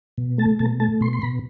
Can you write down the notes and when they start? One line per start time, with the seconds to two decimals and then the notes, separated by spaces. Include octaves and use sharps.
0.18 B2
0.38 A3 A5
0.59 B2 A5
0.80 A3 A5
1.01 B2 C6
1.13 C6
1.22 B2 B5